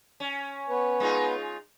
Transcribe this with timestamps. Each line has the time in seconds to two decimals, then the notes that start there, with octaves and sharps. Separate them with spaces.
0.20 C#4
0.69 B3 B4 C#5
1.00 G#3 D#4 F4